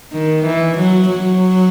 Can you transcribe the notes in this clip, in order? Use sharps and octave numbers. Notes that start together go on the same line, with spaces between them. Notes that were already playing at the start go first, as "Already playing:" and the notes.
D#3
E3
F#3
F#3